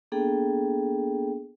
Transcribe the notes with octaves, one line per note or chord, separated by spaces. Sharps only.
A#3 B3 D4 G#4 A4 G5